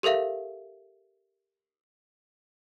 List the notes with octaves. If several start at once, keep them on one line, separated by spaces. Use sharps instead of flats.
G4 A4 A#4 E5 F5